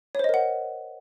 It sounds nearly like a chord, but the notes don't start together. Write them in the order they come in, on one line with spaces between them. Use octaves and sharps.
C#5 C5 D#5 A#4 F#5